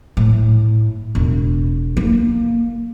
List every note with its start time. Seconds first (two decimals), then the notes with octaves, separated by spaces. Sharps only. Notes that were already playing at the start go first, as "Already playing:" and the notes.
0.17 A2
1.15 E1
1.97 A#3